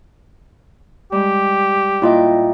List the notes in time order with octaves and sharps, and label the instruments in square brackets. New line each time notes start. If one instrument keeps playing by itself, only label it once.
[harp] G3 G#3 [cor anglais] G4
[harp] A#2 E5 G5 [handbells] E4 F4 D#5